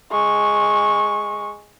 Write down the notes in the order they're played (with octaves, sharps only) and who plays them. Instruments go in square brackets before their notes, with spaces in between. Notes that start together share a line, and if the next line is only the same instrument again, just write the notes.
[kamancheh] G#3 C#6